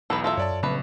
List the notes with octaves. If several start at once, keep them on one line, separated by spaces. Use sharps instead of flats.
B1 E2 A4 B4
F4 A4 E5
F#2 C#5 D5 A5
F#2
A#1 C#3 F#3 A3 C4 B4